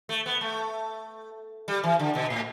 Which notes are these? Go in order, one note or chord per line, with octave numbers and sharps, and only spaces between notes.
A3
B3
A3
G3
E3
D3
B2
A2